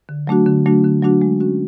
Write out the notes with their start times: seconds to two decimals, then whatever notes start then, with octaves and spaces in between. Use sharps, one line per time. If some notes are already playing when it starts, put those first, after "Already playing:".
0.09 D3
0.27 F#3 A3 D4 F#4
0.46 D3
0.66 F#3 A3 D4 F#4
0.84 D3
1.03 F#3 A3 D4 F#4
1.22 G#3
1.40 C#4 F#4